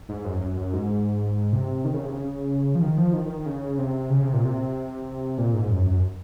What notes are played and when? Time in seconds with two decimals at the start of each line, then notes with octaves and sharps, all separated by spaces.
0.09 G#2
0.25 F#2
0.40 F#2
0.57 F#2
0.73 G#2
1.53 C3
1.85 D#3
1.94 C#3
2.03 C3
2.12 C#3
2.75 F3
2.82 D#3
2.98 F3
3.13 D#3
3.29 D#3
3.46 C#3
3.78 C3
4.10 C#3
4.22 C3
4.34 A#2
4.45 C3
5.38 A#2
5.54 G#2
5.70 F#2
5.87 F#2